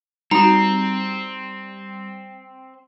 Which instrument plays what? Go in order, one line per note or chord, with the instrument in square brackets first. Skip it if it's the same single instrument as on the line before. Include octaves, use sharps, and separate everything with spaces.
[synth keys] G3 [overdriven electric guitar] C4 [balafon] D#4 F#4 [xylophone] A#5